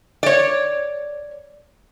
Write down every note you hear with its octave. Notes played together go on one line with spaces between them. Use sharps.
C#5 D5